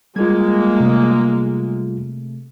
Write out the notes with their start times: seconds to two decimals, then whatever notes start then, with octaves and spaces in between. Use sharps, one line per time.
0.16 G3 G#3 A#3 F4 G#6
0.80 C3 A3